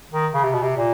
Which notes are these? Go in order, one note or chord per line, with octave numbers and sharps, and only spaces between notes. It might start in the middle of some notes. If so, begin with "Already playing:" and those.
D#3
C#3
C3
B2
C3
A#2